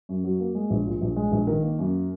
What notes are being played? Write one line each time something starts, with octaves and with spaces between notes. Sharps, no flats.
F#2
F#3
A#3
G#3
A#1
A#2
A#1
G#3
A#1
D#3 A#4
A#3
F#2